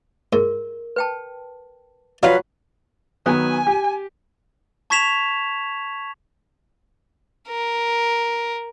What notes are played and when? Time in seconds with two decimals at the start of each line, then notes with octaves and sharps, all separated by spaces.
0.33 G#2 A#4
0.96 B4 G5 A5
2.23 F#3 D4 F4 B4 F5
3.26 D#3 F#3 B3 G#5
3.67 G4
4.90 A5 C#6 G#6 B6 E7 F7
7.49 A#4